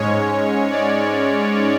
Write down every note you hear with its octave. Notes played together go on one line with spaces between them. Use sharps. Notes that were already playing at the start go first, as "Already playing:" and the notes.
Already playing: G#2 G#3 C#4 C#5
D5